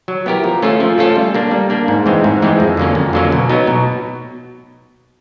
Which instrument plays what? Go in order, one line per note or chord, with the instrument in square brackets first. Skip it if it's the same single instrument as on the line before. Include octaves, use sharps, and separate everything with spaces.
[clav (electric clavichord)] F#3
B3 E4 G4 A#4
F3
A3 C#4 F4 A4
F3
A3 C#4 F4 A4
G3
A#3 D4
G3
A#3 D4
G#2
E3 G#3 C4
G#2
E3 G#3 C4
F2
D3 F#3 A#3 C#4
F2
D3 F#3 A#3 C#4
B2
F#3 B3 D#4
B2